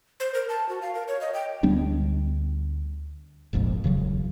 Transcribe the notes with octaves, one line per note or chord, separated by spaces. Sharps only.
C5
A#4
A5
F#4
F5
A#4
C#5
D#5
G5
D2 G3 B3 D4
F1 A#1 F2 G#2
E1 C#3 F#3